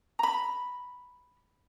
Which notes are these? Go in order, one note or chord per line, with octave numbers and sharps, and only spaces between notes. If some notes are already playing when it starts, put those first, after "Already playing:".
A#5 B5